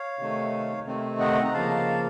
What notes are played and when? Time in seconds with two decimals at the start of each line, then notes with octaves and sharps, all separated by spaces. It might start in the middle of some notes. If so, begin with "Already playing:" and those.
Already playing: C#5 F5
0.19 C3 D#3 A3
0.86 C3 D#3 A3 C4
1.20 D#5 F#5
1.44 A#5
1.53 C#3 F3 A#3 F5 A5